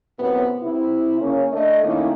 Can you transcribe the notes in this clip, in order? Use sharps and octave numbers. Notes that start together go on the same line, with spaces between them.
F#2 A2 C3 B3
C3 E4
C#3 A#3 C#4
A3 D4 D#5
D#3 A3 A#3 C#4 E4